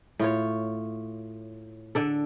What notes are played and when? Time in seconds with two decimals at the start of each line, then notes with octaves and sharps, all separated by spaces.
0.19 A2 F4 C#5
1.95 D3 D4 A4